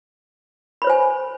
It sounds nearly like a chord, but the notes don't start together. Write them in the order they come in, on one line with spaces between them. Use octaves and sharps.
B5 C#5 C5 G#5